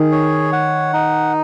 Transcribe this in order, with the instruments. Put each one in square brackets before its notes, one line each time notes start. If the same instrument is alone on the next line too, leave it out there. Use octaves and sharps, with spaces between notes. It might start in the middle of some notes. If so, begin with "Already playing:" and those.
Already playing: [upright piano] D#3 [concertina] G#4
[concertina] C#5
F#5
D#4